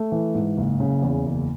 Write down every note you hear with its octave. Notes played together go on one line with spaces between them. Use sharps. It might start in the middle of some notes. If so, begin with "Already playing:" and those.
Already playing: A3
E3
G#2
F#1
C#3
E2
F#1